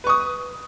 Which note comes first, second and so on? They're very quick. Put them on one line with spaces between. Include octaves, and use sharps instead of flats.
B4 C#6 D#6